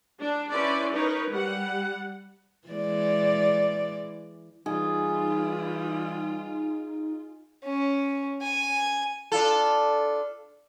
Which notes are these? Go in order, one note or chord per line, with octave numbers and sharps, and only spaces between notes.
D4
C#4 E4 B4 C5 D5
D#4 A#4 B4 C#5
G3 F#5
E3 G#3 D5
E3 G3 D#4 F4 G#4
C#4
G#5
D4 F4 A4